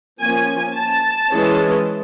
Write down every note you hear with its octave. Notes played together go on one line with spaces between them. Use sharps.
F3 A#3 C#4 G#5
A5
E3 G#3 C#4